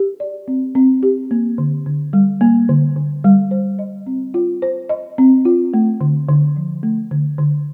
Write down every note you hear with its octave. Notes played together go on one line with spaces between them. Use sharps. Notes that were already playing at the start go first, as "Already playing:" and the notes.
Already playing: G4
D5
C4
C4
G4
A#3
D3
D3
G3
A#3
D3
D3
G3
C5
D#5
C4
F4
C5
D#5
C4
F4
A3
D3
D3
F3
A3
D3
D3